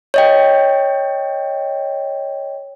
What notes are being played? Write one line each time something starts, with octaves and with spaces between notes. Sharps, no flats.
C#5 D#5 G5